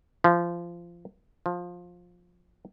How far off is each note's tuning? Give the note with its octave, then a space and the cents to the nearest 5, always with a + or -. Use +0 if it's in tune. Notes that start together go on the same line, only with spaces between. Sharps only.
F3 -20
F3 +15